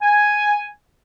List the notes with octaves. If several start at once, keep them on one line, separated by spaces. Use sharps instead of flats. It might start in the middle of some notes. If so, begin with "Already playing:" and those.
G#5